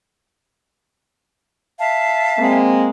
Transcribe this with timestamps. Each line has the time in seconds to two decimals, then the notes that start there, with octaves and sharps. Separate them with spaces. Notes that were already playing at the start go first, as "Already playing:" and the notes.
1.79 E5 F5 A5
2.38 G#3 A#3 C4